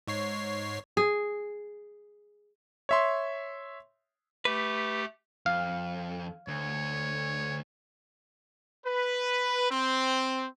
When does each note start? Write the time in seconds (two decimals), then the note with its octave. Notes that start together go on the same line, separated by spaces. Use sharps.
0.07 G#2 C#5 C7
0.97 G#4
2.89 C#5 E5 C6
4.45 A3 G4 B4
5.46 F2 F5
6.48 D2 C#5
8.87 B4
9.71 C4